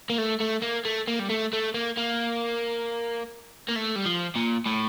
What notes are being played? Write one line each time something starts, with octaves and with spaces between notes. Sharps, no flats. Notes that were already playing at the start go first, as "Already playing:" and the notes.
A#3
A3
A3
A#3
A3
A#3
G3
A3
A3
A#3
A#3
A#3
A3
G3
F3
A#2
A2